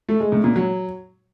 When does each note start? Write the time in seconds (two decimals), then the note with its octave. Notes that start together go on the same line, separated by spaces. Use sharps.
0.09 A3
0.20 G#3
0.32 A2
0.44 A#2
0.56 F#3